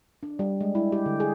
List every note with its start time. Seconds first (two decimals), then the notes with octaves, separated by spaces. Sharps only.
0.23 D4
0.39 G3
0.61 G#3
0.75 E4
0.92 G4
1.06 D3
1.20 G#4